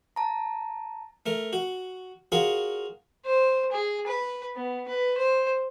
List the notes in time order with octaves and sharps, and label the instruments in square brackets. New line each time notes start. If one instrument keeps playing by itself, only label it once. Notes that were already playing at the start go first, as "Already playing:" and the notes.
[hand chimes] A5 A#5
[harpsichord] A3 A#4
F#4
F4 F#4 G#4 A#4 C#5
[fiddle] C5
G#4
B4
B3
B4
C5